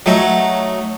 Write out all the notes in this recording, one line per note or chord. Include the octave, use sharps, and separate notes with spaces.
F#3 A3 D#4